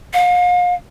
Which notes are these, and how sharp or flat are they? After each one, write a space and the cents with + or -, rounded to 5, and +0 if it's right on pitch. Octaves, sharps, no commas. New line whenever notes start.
F5 +40